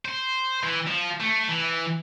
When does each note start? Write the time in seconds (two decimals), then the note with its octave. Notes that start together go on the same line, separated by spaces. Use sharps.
0.05 C5
0.63 E3
0.87 F3
1.20 A3
1.49 E3